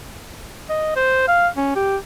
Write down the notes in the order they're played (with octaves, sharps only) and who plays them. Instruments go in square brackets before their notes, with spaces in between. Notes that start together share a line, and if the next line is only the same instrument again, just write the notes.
[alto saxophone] D#5
C5
F5
C#4
G4